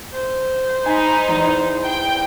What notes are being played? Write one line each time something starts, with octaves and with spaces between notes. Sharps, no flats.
C5
D#4 G#5 B5
E2
G5